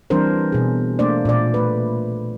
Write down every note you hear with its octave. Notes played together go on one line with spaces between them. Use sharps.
E3 G3 C4 D4 A#4 C5
B2 G#4
A3 A#3 D4 C5 D5
A#2 D5
A3 B4